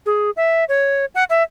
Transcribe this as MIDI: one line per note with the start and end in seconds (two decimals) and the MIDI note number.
0.06 0.30 68
0.37 0.64 76
0.69 1.05 73
1.15 1.24 78
1.30 1.43 76